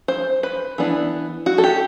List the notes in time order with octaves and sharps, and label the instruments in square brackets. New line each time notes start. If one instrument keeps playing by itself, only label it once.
[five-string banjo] C5
B4
E3 B3 D4
F#4
A4
G4